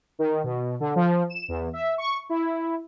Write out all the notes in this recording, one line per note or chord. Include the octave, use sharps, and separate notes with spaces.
D#3
B2
D3
F3
E7
E2
E5
C#6
E4